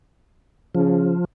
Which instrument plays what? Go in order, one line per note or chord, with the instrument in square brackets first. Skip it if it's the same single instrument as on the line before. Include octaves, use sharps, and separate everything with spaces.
[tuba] C#3 [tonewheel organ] F3